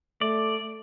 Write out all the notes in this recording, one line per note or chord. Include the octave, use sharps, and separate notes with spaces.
A3 D5